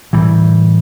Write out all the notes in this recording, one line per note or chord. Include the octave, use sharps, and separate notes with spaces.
A2 E3 G3